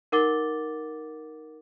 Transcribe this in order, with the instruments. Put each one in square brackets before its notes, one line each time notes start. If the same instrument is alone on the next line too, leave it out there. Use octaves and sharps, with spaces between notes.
[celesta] D#4 A#4 F#5 D6 A6 G7